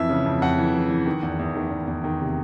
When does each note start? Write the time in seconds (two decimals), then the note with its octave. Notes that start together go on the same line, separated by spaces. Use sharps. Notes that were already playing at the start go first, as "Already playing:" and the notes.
Already playing: F2 E3 E5
0.09 C#3
0.26 F2
0.42 F2 F#5
0.58 E3
0.75 E3
0.90 E3
1.06 D#3
1.23 E2
1.39 E2
1.55 D#3
1.70 E2
1.87 E2
2.04 D#3
2.19 C3